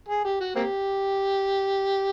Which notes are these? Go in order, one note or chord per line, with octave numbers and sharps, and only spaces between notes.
G#4
G4
F#4
A#3 C4 G4